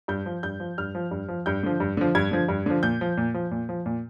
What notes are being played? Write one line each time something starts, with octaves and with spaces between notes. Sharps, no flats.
G2 G6
F3
G2 G6
F3
G2 F6
F3
G2
F3
G2 G6
D3 F3
G2
D3 F3
G2 G#6
D3 F3
G2
D3 F3
A#2 G6
F3
A#2
F3
A#2
F3
A#2